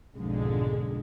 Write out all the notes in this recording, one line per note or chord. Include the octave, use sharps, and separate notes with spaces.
B1 F2 G#2 D3 G#3